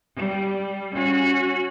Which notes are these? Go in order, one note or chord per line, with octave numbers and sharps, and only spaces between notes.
G3
C#4 F#4